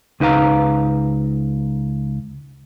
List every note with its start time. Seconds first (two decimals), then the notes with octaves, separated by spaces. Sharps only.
0.20 C#2 D#4 B4 F5 A#5